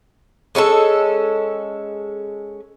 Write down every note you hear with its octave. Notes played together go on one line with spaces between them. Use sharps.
G#3 C#4 E4 A4